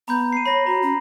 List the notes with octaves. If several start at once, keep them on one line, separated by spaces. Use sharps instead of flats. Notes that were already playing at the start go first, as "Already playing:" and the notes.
B3 A#5 B5 G6
C7 D#7
C#5 B5 A#6 F#7
F#4 A#5
C#4